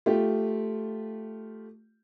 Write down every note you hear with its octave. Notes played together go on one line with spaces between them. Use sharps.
A3 F4 G4